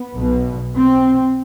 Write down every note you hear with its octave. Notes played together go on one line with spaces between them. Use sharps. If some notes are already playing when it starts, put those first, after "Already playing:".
Already playing: B3
B1 B2
C4